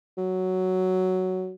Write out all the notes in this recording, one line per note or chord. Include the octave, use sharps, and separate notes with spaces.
F#3